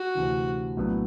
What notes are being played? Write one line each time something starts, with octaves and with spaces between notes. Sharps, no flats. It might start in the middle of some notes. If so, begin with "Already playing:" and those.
Already playing: F#4
D2 C3 E3
A#1 A2 F#3 B3 E4